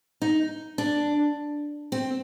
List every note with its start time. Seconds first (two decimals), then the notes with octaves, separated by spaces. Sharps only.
0.22 D#4
0.78 D4
1.92 C4